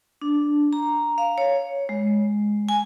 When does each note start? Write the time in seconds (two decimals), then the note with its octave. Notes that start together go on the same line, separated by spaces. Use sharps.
0.22 D4
0.73 A#5
1.18 F5
1.38 C#5
1.89 G#3
2.69 G#5